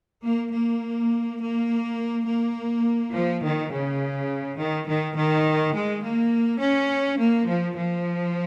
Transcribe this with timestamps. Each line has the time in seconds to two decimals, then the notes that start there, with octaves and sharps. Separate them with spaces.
0.23 A#3
0.53 A#3
1.40 A#3
2.27 A#3
3.13 F3
3.42 D#3
3.71 C#3
4.59 D#3
4.87 D#3
5.16 D#3
5.74 G#3
6.03 A#3
6.60 C#4
7.18 A#3
7.47 F3
7.77 F3